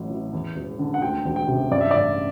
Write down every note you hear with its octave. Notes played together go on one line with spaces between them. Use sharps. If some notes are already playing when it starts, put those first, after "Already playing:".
Already playing: A1 A2 F#3
E3
E2
E1
D3
F#5
D2 G5
E1
G5
C3
G2 D5
E5
A1 D5